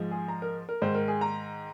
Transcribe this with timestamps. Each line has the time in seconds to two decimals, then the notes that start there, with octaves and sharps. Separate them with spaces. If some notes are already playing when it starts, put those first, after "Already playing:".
Already playing: G#2 F3 G#3
0.11 G#4
0.28 A#5
0.42 A#4
0.69 A#4
0.82 G#2 D#3 G#3 C5
0.95 A#4
1.08 G#4
1.21 A#5